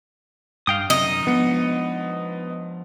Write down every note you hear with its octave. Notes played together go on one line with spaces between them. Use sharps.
G2 F5 G5 D#6
F#2 C3 D#3 D#4 D#5
F3 G#3 B3 D4 C#7